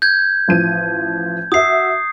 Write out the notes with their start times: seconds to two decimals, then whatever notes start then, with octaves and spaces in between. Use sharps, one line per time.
0.02 G6 G#6
0.48 A1 F3 D#7
1.52 F#4 E5 D#6 C7